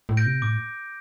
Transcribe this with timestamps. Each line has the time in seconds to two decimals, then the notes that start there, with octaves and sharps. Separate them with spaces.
0.09 A2
0.17 G6 A#6 D7
0.26 C3
0.42 A2 D6